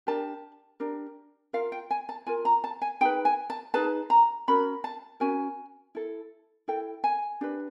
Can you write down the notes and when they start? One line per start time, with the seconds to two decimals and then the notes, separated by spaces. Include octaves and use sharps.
0.07 D4 G4 A#4 A5
0.80 D4 G4 A#4
1.53 F4 A#4 F5
1.72 G5
1.91 G#5
2.09 A5
2.27 F4 A#4 G#5
2.45 A#5
2.64 A5
2.82 G#5
3.01 D#4 G#4 B4 G5
3.25 G#5
3.50 A5
3.74 D#4 G#4 B4 A5
4.10 A#5
4.48 C#4 F#4 A#4 B5
4.84 A5
5.20 C#4 F#4 A#4 G#5
5.95 E4 A4
6.68 E4 A4 G5
7.04 G#5
7.41 D4 G4 B4